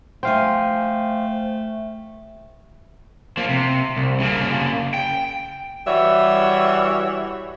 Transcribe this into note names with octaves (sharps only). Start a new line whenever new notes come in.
A3 C5 F5 G5 G#5
F3 A#3
C3
C2
C#3 A#3
G5
E3 G3 F#4 C#5 E5